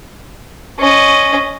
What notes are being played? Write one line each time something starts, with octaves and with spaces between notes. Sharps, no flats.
C#4 D#5